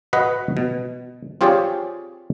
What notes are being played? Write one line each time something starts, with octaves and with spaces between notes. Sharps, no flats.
F#4 B4 D#5 F#5
B2
C4 F4 G4 G#4 C#5 D5